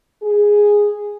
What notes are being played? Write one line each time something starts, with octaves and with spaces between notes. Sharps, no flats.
G#4